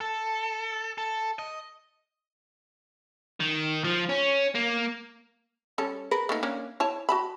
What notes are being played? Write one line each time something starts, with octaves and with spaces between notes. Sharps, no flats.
A4
A4
D#5
D#3
F3
C#4
A#3
G3 C#4 A4
G#4 A#4 B4
A3 A#3 D#4
A#3 C#4 D4
E4 C#5 A5
F#4 A5 B5